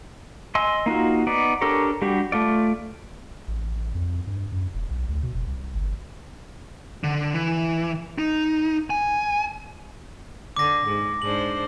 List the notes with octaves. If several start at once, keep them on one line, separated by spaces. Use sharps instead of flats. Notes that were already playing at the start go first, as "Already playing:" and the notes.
D#5 G#5 C6 E6
A#3 D#4 F4 F#4
B3 D#4 D5
D4 G4 A4 A#4 C#5
G3 D4 F#4 G4
A3 F4 D5
A1
F2
G2
F#2
E1
B1
D2
B2
F1
C2
G1
D3
E3
D#4
G#5
D3 D6 A#6
G#2
G#2 D4 C5 F#7